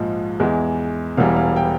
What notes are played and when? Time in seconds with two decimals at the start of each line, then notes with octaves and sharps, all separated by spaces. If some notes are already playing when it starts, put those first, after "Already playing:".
Already playing: A#1 G#2 F3 G#3
0.40 E2 E3 G#3
1.17 E1 E2 E3 G3 F5
1.37 F5
1.56 G5